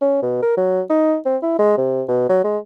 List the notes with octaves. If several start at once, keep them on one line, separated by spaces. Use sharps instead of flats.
C#4
B2
A#4
F#3
D#4
C4
E4
G#3
C3
B2
F#3
G#3